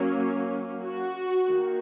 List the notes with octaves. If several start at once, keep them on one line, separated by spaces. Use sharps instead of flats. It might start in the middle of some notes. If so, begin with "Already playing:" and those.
Already playing: F#3 A#3 C#4
F#4
D#3 A#3